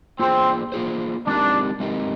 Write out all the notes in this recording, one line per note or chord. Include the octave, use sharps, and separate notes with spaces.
A#3 C4 F4 G#4 C5
A#3 F4 G#4 C5
G#3 C4 D4 D#4 G4 A#4
G#3 C4 D#4 G4 A#4